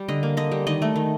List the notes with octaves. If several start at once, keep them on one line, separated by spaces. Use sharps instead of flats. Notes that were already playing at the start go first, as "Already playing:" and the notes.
Already playing: G3
D3 D#5
A#3
D3 D#5
G3
D#3 D#5
A3
D#3